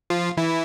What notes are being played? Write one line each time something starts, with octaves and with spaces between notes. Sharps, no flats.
F3 F4
E3 E4